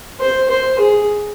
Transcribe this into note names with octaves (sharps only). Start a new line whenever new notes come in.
C5
C5
G#4